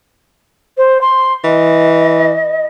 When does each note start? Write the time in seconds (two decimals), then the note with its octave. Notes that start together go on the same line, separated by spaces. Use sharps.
0.77 C5
1.01 C6
1.44 E3 D#5